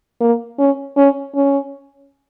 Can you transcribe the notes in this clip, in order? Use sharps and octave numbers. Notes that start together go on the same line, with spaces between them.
A#3
C#4
C#4
C#4